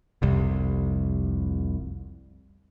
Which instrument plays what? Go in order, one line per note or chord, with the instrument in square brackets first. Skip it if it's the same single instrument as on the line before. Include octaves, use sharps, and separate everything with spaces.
[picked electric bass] F1 C2